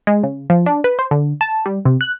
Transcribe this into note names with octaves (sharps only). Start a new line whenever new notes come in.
G#3
C#3
F3
D4
B4
C5
D3
A5
G3
C3
F#6